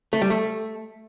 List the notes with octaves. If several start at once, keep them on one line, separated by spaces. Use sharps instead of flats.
A3
G3
A3